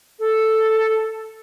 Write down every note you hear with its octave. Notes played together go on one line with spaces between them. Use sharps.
A4